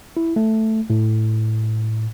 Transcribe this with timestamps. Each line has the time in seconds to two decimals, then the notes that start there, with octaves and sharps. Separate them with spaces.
0.17 E4
0.36 A3
0.90 A2